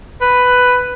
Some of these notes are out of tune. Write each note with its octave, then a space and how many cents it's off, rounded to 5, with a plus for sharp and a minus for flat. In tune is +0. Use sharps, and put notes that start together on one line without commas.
B4 +5